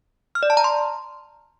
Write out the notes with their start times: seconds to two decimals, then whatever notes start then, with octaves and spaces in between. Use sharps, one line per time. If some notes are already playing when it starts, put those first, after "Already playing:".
0.35 F6
0.43 D5
0.50 A5
0.57 A#5
0.64 C6